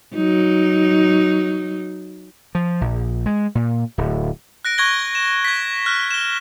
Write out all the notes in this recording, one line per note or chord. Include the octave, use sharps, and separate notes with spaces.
F#3 D#4
F3
A#1
G#3
A#2
D1
F#6 A#6 D7
C#6 F#6 G#6 A#6 G7
E7
G#6 B6
F6 F#6
E7 G7